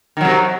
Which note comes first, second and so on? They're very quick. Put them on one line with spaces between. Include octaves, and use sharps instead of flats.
D#3 F#3 C3